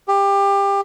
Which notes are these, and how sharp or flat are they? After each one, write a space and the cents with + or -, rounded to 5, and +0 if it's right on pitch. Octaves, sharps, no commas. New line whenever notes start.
G4 +25